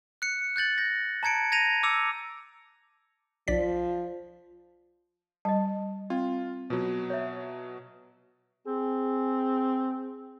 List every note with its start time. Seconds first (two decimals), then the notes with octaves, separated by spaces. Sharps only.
0.22 F#6 C#7
0.56 F#6 G6 A6 F#7
0.78 G6 A#6
1.23 A5 A#5 G#6 C#7 D7
1.52 G#6 A#6 D#7 F7
1.83 D6 E6 C#7 F7
3.48 B1 F3 D5 B6
5.45 G3 D#5 A5
6.10 C4 F4
6.70 B2 F#3 F4
7.10 C#5 E5
8.67 C4 G#4